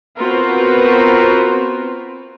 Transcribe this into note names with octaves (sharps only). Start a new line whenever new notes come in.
B3 C4 F4 F#4 A#4 B4